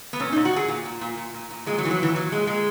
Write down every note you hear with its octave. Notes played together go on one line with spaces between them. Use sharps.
B3
A#2 C#4
D#4
A#2
F#4
A#2 G#4
A#2
A#2
A#2
A#2
A#2
A#2
A#2 G#3
F#3
A#2 E3
F#3
A#2 E3
A#2 F#3
A#2 G#3
A#2 G#3